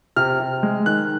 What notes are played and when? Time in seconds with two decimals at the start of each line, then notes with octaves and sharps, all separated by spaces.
0.16 C3 F6
0.40 C3
0.63 G#3
0.86 D#3 F#6